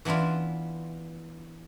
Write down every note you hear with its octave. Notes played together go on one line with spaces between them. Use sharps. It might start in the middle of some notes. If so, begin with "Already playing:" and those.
E3 B3 D4 E4 F4